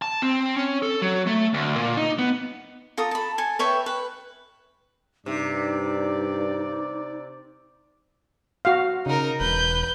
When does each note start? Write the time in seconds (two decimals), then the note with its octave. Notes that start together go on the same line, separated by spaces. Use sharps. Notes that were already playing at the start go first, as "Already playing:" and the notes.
0.02 A5
0.22 C4
0.56 C#4
0.83 A4
1.02 F#3
1.27 A3
1.54 D2
1.77 A#2
1.97 D#4
2.19 B3
2.97 F4 A4 A#5 D#6
3.11 A5 B5
3.38 A4 G#5
3.59 B4 C#5 E5 G5
3.86 B4
5.26 G2 C3 D#4 D5
8.65 F#4 F5
9.06 C#3 D#4 A#4
9.40 E1 B4 G6